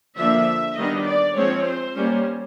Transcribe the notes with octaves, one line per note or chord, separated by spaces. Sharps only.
D3 F3 A#3 D4 E5
D#3 G3 B3 D4 D#5
D5
F3 G#3 C4 C#5
C5
G3 A#3 C#4